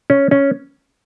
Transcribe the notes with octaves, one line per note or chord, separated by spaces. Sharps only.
C#4
C#4